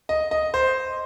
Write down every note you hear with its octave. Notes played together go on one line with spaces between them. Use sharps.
D#5
D#5
C5